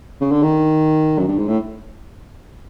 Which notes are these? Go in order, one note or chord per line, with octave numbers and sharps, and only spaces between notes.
C#3
D3
D#3
F#2
G2
G#2
A2